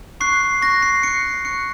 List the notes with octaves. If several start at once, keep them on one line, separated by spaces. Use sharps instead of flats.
C#6 F#6 C7
C#6 F#6 A#6
C7
C#6 F#6 C#7
C#6 F#6 C#7